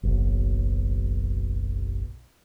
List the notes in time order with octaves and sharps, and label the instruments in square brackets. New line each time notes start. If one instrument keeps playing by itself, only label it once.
[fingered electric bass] F#1 B1